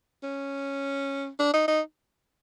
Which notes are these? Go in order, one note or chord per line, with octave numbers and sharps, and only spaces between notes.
C#4
D4
D#4
D#4